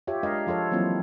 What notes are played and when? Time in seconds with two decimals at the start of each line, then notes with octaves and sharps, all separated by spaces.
0.07 F4 G4 C#5 E5
0.23 G#3 D4 A#4 D#5 F5
0.47 F3 F4 A4 C#5
0.71 E3 F#3 A#3 C4 E4 F4